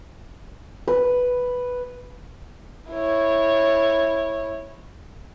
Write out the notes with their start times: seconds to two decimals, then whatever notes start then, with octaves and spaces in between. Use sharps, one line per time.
0.88 B4
2.91 E4 C#5